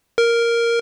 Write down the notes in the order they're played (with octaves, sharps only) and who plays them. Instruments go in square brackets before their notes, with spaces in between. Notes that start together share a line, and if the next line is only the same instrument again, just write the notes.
[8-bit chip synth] A#4